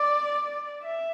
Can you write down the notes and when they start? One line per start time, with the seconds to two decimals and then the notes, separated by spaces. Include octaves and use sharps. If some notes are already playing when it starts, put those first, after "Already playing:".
Already playing: D5
0.83 E5